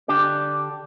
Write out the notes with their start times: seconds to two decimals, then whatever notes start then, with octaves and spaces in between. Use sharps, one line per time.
0.08 D3 D4 G4 D5